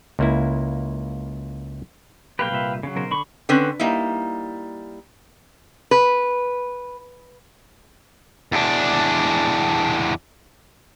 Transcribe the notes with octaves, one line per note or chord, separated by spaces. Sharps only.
C#2 A#3 E4
B1 A#3 G4 B4 F5 G5
C2 A#2 E5
C#3 F#3
B1 A#4 C5
D3 B5 C#6
D3 C4 C#4 B4
G3 A#3 D#4 E4
B4
E2 D4